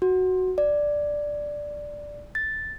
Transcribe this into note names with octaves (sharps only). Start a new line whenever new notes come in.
F#4
D5
A6